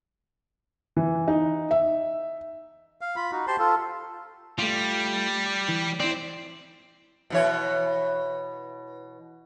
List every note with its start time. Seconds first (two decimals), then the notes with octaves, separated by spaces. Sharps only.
0.97 E3
1.28 D#4
1.71 E5
3.01 F5
3.16 F4 B5
3.32 D#4 F#4
3.47 G4 C5 A5 C6
3.59 F4 A4
4.59 G3 A3 F4
5.68 E3
6.00 C4 E4 D5
7.30 B2 E3 C#5